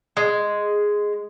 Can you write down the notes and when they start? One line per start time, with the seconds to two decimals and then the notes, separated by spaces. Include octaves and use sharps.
0.17 G#3